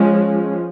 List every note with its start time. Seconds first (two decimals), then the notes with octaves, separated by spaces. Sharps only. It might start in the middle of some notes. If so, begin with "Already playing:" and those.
Already playing: F3 G#3 C#4